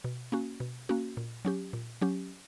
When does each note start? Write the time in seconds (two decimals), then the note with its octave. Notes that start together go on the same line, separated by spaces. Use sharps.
0.04 B2
0.32 A#3 C#4 F#4
0.60 B2
0.89 A#3 C#4 F#4
1.17 A#2
1.45 F#3 C#4 G4
1.73 A#2
2.01 F#3 C#4 G4